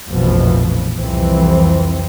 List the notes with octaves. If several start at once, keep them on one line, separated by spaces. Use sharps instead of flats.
F1 A#1 F2 B2 E3 F3
C2 F2 E3 C4